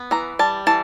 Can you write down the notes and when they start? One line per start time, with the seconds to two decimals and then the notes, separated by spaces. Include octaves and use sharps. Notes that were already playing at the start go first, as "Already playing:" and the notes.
Already playing: B3
0.11 E3 A#5
0.39 G3 A5
0.67 E3 A5